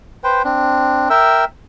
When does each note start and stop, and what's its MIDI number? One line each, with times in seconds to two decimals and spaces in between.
0.24 0.42 71
0.24 0.42 72
0.24 0.42 79
0.44 1.09 60
0.44 1.09 62
1.10 1.45 70
1.10 1.45 76
1.10 1.45 79
1.10 1.45 88